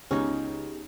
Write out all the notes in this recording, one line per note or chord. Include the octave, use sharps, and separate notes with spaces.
C#2 B3 C#4 D#4 G4 G#4